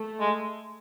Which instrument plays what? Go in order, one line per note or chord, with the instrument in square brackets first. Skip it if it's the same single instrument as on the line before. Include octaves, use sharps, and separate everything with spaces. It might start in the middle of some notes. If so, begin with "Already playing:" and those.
Already playing: [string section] A3
[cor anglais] G#3